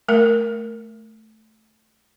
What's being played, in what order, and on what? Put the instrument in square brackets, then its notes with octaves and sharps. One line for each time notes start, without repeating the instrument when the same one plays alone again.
[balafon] A3 A#4